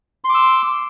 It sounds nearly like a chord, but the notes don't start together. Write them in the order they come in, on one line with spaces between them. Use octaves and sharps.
C6 D6 E6